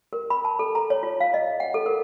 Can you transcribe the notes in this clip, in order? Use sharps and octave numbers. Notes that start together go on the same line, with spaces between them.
A#4
B5
A5
A4
A#5
C#5
F4
F5
D#5
F#5
A4
A#4